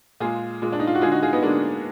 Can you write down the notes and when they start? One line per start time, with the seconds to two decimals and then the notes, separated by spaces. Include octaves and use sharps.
0.20 A#2 G#3 F4 G#4
0.62 A#2 G#3
0.72 D4
0.80 D#4
0.87 F4
0.95 F#4
1.01 G#3 F4 G#4
1.06 D3
1.12 D#4 F#4
1.22 F4 G#4
1.33 B3 D#4
1.42 D3 G#3 A#3 D4